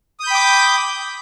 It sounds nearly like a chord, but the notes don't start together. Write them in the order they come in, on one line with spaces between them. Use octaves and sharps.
D#6 G6 B5 G5 D6